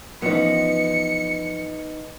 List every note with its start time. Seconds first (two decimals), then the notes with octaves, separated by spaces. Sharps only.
0.22 E3 F3 B3 C#4 D#4 C#7